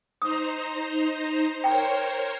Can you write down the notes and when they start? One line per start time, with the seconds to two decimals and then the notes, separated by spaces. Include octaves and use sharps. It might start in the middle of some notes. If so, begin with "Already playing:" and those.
0.22 D#4 C5 A#5 D#6
1.64 A#4 C5 C#5 G5 A#5